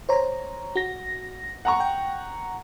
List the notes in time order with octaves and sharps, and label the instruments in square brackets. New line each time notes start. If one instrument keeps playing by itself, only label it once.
[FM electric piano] C5 C#5 A#5
F#4 A#6
[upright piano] F#5 A#5 C#6
[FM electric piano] G5